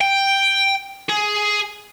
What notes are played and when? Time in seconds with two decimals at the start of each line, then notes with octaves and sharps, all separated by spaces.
0.01 G5
1.09 G#4